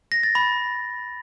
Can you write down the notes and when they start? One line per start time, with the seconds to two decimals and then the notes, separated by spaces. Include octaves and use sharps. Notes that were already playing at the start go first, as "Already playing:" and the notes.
0.12 A#6
0.23 A6
0.35 B5